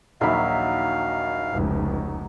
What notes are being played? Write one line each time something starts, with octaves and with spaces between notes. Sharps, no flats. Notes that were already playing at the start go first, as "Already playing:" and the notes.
A#1 D#2 F#3 D#4 E5 F5 B5
F1 C#2